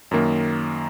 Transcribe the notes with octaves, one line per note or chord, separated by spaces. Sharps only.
F#2 D#3 A#3